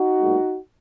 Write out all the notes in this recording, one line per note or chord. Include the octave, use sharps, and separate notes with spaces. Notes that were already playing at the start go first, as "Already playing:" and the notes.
Already playing: D#4 F#4
B1 A#2 G#3